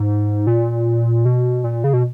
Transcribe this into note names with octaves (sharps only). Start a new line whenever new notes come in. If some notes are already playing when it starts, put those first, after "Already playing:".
Already playing: G#2
A#2
B2
A#2
C#3
B2